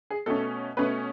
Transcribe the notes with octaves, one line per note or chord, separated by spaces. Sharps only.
G#4
B2 A3 C#4 A4
B2 A3 C#4 B4